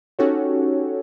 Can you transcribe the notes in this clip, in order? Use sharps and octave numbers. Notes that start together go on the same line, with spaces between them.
C#4 D#4 F#4 G4 A4 C#5